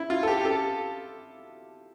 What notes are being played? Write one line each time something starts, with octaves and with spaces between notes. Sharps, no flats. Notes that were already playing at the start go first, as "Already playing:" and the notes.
Already playing: E4
F4
A4
G4
G4
A4